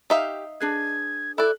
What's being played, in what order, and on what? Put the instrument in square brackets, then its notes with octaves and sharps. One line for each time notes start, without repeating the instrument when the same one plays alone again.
[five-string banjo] D#4 E5 F5 [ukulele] G4
[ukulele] D4 G#4 B4 [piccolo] G#6
[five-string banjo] E4 D5 [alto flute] A4 [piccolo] F#6